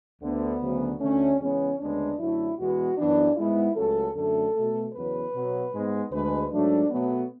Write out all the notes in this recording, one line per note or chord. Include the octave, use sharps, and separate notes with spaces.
D2 D3 A3 B3
D2 C#3 F#3
D2 D3 A3 C#4
E2 C#3 G#3 B3 C#4
D2 C#3 G#3 B3 D4
F#2 D3 F#3 A3 E4
E2 B2 G#3 B3 F#4
F#2 E3 B3 D4
G#2 G#3 B3 E4
C#2 C#3 F#3 A3 A4
F#2 D3 A3 A4
B2 A3
E2 C#3 F#3 B3 B4
B2 F#3 B3
G#2 G#3 B3
D2 D3 G#3 B4
G#2 F#3 A3 D4
B2 F#3 A3 B3